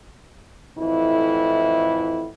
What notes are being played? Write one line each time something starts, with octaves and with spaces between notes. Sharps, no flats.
F2 A2 E3 E4